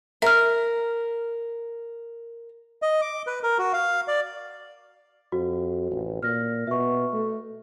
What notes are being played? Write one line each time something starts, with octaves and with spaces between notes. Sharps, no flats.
A#4 E5 F6
D#5
D6
B4
A#4
F#4
F5
D5
F2 F#4
A1
A#2 F6 A#6
B2 E5 C#6
A3